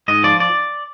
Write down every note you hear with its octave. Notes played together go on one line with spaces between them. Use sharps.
G#2 D#5
F3 D5
D5